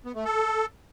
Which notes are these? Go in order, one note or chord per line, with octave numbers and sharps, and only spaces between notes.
B3
A3
A4